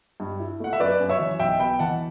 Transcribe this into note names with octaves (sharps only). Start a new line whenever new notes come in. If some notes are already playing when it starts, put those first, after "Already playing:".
G2
E4
A3 F#5
E5
F#2 B4 D5
F#2
C#5 E5
E3
B1 E5 G5
B3 G5 B5
E3 F#5 A5